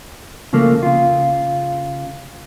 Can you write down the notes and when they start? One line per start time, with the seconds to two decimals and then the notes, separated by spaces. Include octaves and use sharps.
0.53 C#3 F3 A3 A#3
0.83 C#3 F4